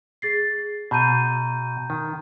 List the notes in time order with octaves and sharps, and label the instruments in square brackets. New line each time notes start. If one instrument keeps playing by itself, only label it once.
[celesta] G#4 A6 C7
[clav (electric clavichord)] B2 [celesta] A#5 G6 D#7
[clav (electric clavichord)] D#3